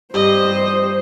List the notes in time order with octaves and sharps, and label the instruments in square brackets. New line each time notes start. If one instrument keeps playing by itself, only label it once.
[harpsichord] G2 [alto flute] G4 [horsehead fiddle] C5 [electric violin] D#5